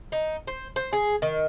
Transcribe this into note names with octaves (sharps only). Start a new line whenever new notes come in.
D#4
C5
C5
G#4
D#3